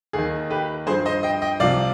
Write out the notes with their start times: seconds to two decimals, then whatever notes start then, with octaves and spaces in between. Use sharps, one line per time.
0.13 D#2 D#3 G#4
0.51 G4 B4
0.86 G2 G#4 C5
0.90 F3
1.06 C5 D#5
1.23 D#5 G5
1.42 D#5 G5
1.60 C2 C3 F3 D5 F5